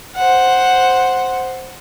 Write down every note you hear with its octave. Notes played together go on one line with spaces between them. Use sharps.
C5 F#5